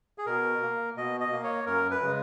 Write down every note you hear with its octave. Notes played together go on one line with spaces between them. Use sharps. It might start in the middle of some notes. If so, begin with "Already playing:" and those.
G#4
B2 A#4
A#3
B2 D#5
D#5
A#3
C#5
F#2 A#4
B4
C#3 G#3